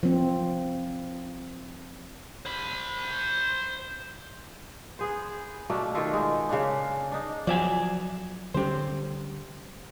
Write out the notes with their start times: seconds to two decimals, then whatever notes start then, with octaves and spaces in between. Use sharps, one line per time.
0.03 F3 C4
2.46 C5 B5
4.99 B3 G#4 C5
5.70 B2 A3 A#3 D4
5.94 D#3 F4 G4 A4
6.13 G#3
6.49 C#3 A#3 D4
7.12 D4 D#4
7.47 F3 F#3 D5 E5 G#5
8.54 D3 G3 C#4 G4 C5